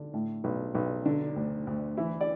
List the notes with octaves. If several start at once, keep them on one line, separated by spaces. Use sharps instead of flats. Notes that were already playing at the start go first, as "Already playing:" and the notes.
Already playing: D3
A2
B1
B1
D3 D4
D2
D2
E3 E4
D5